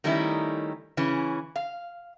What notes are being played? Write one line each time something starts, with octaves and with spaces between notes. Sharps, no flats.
D#3 G3 A3 C#4 D#4 E4
C#3 E3 C#4
F5